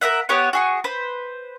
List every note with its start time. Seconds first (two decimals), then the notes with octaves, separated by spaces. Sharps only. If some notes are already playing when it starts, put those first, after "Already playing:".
0.01 A#4 B4 E5 F#5
0.29 B3 G4 C#5 F#5
0.53 F#4 G#4 C#6
0.84 B4 C5